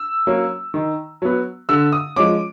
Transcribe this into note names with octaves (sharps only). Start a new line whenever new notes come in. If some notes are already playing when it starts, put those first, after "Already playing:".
Already playing: E6
F#3 A#3 C#4
D#3
F#3 B3
D3 E6
D#6
F3 G#3 C#4 D6